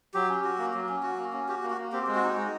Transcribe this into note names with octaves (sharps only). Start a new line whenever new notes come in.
F#3 G4
C#4
F#4
A#3
F#3
C#4
F#4
A#3
C#4
F#4 G4
A#3
F#4
A#3
C4 G4
G#3
F#4
D#4
G#3